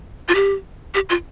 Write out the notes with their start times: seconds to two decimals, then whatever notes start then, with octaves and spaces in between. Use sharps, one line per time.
0.29 F4
0.35 G4
0.94 G4
1.09 F4